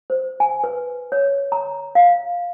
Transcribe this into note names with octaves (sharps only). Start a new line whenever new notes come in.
C5
G#5
B4
C#5
A#5
F5